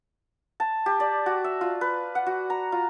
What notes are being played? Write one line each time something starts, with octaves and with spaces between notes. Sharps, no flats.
A5
G4
D5
F#4
E5
F4
B4
F#5
F#4
A#5
F4